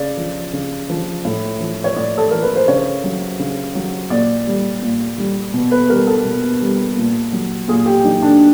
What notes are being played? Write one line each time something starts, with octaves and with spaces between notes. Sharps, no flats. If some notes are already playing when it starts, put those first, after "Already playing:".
Already playing: C#3 D5
F3
C#3
F3
A2
F3
C#5
A2 D5
A4
F3 A#4
B4
C5
C#3 C#5
F#3
C#3
F#3
A#2 D5
G3
A#2
G3
B2
B4
G3 A#4
A4
B2
G3
A#2
F#3
A#2 G#4
G4
F#3 D#4
D4